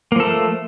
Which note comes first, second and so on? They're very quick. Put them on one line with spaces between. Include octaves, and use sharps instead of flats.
A#3 F3 A4 A3